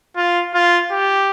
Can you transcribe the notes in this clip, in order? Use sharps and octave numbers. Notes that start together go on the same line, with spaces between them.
F4
F4
G4